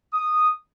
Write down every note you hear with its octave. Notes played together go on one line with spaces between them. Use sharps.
D#6